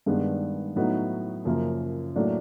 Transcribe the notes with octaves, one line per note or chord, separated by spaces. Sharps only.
G2 D#3 G#3 B3 D4
A2 F#3 B3 D#4
F#2 C#3 F3 A#3
A2 F#3 A#3 D4